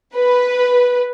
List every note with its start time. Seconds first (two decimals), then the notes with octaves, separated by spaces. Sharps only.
0.16 B4